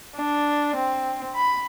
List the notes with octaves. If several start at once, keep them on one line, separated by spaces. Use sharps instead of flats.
D4
C4
B5